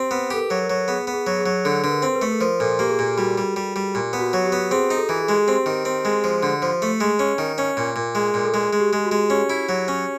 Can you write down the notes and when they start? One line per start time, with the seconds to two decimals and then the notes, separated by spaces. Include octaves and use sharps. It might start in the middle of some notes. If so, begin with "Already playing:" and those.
Already playing: C4 G4
0.11 B3 B4
0.30 G4 A4
0.37 A#4
0.50 F#3
0.63 A#4
0.70 F#3
0.88 B3 G#4
1.07 B3
1.14 G#4
1.27 F#3
1.39 G#4
1.46 F#3
1.64 D3 A4
1.84 D3 B4
1.90 A#4
2.02 C4
2.15 B4
2.22 A3
2.32 A4
2.41 F3 A#4
2.60 A#2 A4
2.79 A#3 G4
2.90 G#4
2.98 A#2 G4
3.17 G3 F#4
3.38 G3
3.56 G3
3.76 G3
3.94 A#2 G4
4.13 B3
4.19 F#4
4.33 F#3
4.45 G4
4.52 B3
4.71 C4 G#4
4.91 D#4
4.97 A4
5.09 E3
5.22 G#4
5.29 G#3
5.48 C4 G4
5.66 D#3
5.85 C4
6.05 G#3
6.24 F3
6.43 D3
6.62 F3
6.82 A3
7.00 G#3
7.19 C#4
7.38 D#3
7.58 C#4
7.77 A#2
7.96 A#2
8.15 G#3
8.34 A#2
8.45 A4
8.53 G#3 G#4
8.73 G#3
8.80 G4
8.93 G#3
9.05 F#4
9.12 G#3
9.30 C#4 G4
9.50 E4
9.69 F#3
9.88 C#4